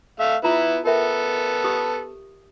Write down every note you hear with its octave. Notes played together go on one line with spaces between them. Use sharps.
A3 E5 F5
B3 E4 F4 A#5
B3 A4 A#4 E5 G5
G4 D#6